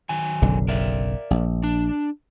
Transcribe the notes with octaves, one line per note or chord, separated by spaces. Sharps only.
D#3 F#3 G#5
F#1 B1 D3
A#4 D5 E5
A#1
D4 A5